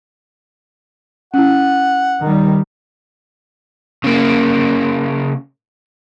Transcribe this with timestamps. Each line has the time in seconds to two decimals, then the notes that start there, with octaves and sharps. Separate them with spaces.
1.34 C#4 E4 F#5
2.21 D#3 G3
4.04 C#3 A#3